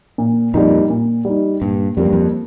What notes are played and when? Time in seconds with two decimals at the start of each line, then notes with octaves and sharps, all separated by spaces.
0.18 A#2
0.54 F2 A#2 G3 D#4
0.90 A#2
1.25 G3 D#4
1.62 G2 A#2
1.97 F2 G3 A#3 G4
2.05 G2
2.13 F2